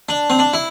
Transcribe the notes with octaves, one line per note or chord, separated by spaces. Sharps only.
D4
C4
D4
E4